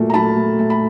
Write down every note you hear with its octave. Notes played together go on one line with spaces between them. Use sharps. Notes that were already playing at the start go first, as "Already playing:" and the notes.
Already playing: A#2 F#3 A3
A#5
F#3 A5 B5
A3
A3
B5